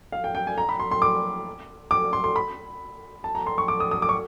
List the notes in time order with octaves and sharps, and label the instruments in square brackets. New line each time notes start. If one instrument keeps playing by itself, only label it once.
[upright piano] F5
G5
G5
G#5
A#5
B5
C6
C6
D6
D6
C6
C6
B5
A5
A#5
C6
C#6
D6
D#6
D#6
D6
C#6